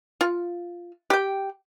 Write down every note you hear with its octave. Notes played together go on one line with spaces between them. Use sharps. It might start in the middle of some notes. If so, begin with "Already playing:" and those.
F4
G4 G5